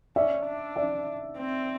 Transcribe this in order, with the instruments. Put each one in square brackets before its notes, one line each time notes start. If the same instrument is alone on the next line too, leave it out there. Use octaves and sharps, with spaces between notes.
[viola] C#4 [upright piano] D5 E5
[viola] D4
[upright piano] D5 E5
[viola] C4